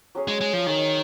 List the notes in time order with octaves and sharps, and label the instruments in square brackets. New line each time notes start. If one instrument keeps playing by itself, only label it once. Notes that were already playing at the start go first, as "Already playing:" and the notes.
[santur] F#3 C#4 G#4 C#5
[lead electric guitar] G#3
G#3
F3
[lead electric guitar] D#3 [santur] F#3 C#4 G#4 C#5